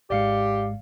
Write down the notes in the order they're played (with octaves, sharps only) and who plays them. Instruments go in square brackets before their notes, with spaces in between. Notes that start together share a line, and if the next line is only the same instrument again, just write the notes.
[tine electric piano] G#1 G#2 G#3 [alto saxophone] G4 [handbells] D5 F5 C#7